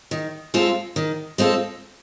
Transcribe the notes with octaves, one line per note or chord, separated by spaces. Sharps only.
D#3
G#3 C4 F4 A4
D#3
G#3 C4 F4 A4